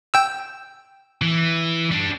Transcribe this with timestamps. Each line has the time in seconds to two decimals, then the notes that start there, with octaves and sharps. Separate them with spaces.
0.14 G5 E6
1.22 E3
1.91 G3 D4